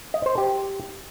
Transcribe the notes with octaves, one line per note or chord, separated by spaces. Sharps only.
D#5
C5
G4